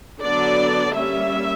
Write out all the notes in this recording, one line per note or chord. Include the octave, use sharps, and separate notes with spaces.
D3 F#3 B3 D4 D5
G3 A#3 C#4 E5